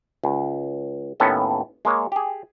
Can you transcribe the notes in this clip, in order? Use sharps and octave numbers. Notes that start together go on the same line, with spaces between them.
C#2
D#2 A2 B3 C#4 A4
G#3 A#3 C#5
G4 G#4